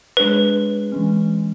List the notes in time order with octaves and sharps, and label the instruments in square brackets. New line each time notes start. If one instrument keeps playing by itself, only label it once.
[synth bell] G#3 D4 G#4 C#5 [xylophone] B4
[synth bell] E3 G#3 C#4